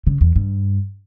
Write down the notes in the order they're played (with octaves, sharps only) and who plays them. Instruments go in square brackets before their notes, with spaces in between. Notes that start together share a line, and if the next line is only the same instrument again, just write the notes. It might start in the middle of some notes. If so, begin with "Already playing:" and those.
[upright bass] C#3
E2
G2